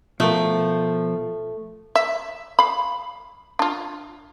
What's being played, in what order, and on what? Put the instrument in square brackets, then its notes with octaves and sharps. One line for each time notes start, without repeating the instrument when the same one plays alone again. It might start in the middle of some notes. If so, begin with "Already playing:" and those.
[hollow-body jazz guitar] B2 A#4 [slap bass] F3 [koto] A3
[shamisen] E5
F5 B5
D4 F4